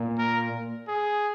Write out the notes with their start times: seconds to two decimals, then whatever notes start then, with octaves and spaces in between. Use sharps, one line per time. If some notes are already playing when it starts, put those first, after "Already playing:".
Already playing: A#2
0.18 A#4
0.88 G#4